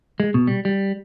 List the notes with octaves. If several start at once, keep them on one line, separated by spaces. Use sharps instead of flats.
G#3
B2
G3
G3